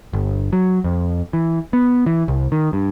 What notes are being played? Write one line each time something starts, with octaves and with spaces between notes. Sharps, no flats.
G1
F#3
F2
E3
B3
E3
C2
D#3
G2